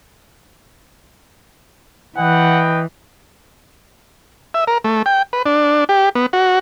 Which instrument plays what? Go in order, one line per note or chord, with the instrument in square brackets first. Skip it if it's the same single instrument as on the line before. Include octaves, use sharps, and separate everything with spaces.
[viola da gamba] E3 [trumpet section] B4 D#5 G5 [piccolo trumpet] F#5
[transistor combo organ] E5
A#4
A3
G5
B4
D4
G4
B3
F#4